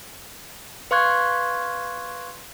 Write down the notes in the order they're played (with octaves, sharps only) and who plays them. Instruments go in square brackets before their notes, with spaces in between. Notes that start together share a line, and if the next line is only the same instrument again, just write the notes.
[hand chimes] B4 F5 C6 C#6 F#6 G#6